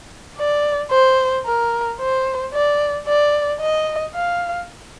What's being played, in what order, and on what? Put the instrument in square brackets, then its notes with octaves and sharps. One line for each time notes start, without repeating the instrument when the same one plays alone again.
[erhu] D5
C5
A#4
C5
D5
D5
D#5
F5